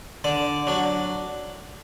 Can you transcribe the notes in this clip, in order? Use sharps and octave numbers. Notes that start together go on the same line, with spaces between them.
D3 D5
F#3 D4